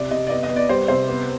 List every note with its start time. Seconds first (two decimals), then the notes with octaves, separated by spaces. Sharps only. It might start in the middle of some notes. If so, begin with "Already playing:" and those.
Already playing: C3 D5
0.11 C3 D#5
0.27 D5
0.30 B3 D#5
0.43 D#5
0.50 B3
0.56 D5
0.69 G3 C5
0.88 C3 C5
1.08 B3